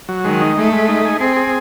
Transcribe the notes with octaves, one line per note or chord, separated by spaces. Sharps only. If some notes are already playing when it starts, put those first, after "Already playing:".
F#3
D#3 G#3
D#4
G#3 A3
G#3
D#4
G#4
C4 G#4
G#4